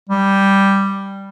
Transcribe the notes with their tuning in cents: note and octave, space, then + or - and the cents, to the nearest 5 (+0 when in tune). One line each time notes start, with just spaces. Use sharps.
G3 +0